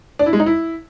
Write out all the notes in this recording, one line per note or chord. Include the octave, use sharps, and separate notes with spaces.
D4
E4
G#3
D#4
E4